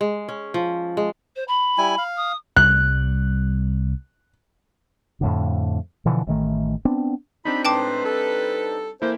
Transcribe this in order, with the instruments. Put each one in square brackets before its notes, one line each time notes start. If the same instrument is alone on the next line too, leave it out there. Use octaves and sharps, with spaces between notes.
[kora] G#3
C#4
F3
G#3
[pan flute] C5
B5
[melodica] G3 E4 G#5
F5
[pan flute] D#6
[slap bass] C2 G3 [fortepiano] F#6
[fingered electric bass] F2 A2 D3
B2 D3 E3 F3
A1 D#3 A3
B3 C4 D4
[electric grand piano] C4 D4 D#4 [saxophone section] F4 G4 [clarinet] B5
[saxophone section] A2 G#3 C5 [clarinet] B4 [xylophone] G5 A5 D6
[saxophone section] G3 A4
[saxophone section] E3 C4 A4 [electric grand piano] A#3 E4 [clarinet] C5